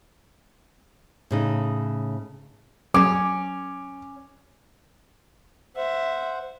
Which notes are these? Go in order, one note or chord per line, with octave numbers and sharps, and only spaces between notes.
A2 C#3 D#4
F#3 C#4 G#4 D6
C5 E5 F#5